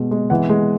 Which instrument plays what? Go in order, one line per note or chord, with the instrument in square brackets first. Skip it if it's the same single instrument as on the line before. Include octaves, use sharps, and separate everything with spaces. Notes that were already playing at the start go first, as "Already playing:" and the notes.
Already playing: [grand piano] B2 G#3
G#3
E3 F#5
G#3